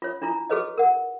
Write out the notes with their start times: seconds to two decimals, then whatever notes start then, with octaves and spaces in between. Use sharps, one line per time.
0.02 F4 C#5
0.22 D4 E4 F4 A#5
0.50 F#4 G#4 A4 B4 C#5 D#5
0.78 A#4 F#5